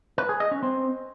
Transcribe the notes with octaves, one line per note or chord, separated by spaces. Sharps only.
B4
G#4
D#5
C#4
C4